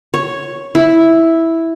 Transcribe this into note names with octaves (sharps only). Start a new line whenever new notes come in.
C#5
E4